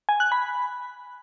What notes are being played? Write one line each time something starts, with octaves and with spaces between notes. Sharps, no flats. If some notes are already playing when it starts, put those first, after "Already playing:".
G#5
F#6
B5